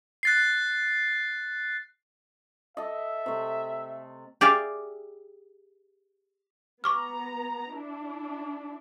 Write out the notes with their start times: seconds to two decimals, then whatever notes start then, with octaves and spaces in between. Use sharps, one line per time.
0.23 F#6 A6 C7
2.77 A4 D#5 E5
3.26 C3 A3
4.41 G4 G#4 D5 E5 F5
6.84 B3 A#5 C#6 D6 F6
7.74 D4 E4